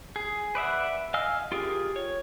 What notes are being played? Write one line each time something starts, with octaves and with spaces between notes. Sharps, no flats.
G#4
B4 D5 E5 F#5
D#5 F5 G#5 E6 F6
F4 G4 G#4 A#4
C#5